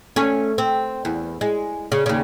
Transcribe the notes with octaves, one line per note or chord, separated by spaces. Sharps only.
A3 C#4
C4
E2
G#3
C#3
D#2 C#3